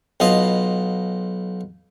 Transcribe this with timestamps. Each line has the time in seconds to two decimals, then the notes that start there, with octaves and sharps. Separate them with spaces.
0.20 B1 B2 F4 D#5